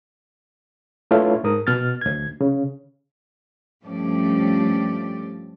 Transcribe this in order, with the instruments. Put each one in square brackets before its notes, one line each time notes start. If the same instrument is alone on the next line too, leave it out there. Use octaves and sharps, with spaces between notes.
[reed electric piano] A3 D4 E4 F4 B4 C#5
G#2 A#4 D#6
B2 F6 A6
D2 G#6
C#3
[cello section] G2 F3 A3 C#4 G4 D5